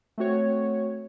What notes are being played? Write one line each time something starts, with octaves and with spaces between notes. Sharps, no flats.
A3 C4 F#4 C#5